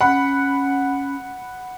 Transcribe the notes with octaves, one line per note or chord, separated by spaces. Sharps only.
C#4 F#5 B5